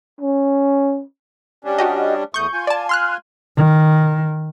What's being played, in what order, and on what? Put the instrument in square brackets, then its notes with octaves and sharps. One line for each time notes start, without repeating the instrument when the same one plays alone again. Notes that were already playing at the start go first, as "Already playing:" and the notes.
[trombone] C#4
[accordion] G3 C#4 D4
[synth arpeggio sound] F#4 G4 D#5
[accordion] E2 A3 D#6 [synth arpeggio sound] C#6 G6
[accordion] F4 G#5
[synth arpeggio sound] D5 A5
C6 F6 F#6
[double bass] D#3